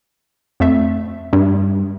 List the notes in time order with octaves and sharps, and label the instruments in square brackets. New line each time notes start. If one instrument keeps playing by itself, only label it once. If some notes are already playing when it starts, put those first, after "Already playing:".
[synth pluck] F2 A3 E5
[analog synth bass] G2